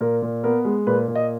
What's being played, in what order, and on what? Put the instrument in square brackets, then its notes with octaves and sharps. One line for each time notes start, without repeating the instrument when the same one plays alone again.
[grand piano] A#2 A#4
A#2
B3 A#4
G#3
A#2 B4
A#2
D#5